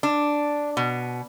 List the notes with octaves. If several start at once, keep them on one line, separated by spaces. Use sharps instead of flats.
D4
B2